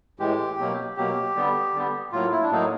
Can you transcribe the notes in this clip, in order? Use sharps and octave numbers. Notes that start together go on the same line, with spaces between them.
A2 E3 G#3 G4
B2 F#3 A#3
B2 F#3 A#3 G4
D3 G3 B3
D3 G3 B3
A2 F#3 A#3 F4
E4
D4
A2 F#3 A#3 D#4